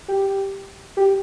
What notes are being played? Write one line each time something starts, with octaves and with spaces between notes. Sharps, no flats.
G4
G4